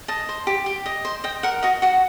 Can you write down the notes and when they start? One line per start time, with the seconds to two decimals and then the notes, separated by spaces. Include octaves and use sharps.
0.08 D#5 A5
0.29 C5
0.47 G4
0.66 G4
0.86 D#5
1.05 C5
1.24 D#5 G5
1.43 A#4 F#5
1.63 F#4 D#5
1.82 F#4 F#5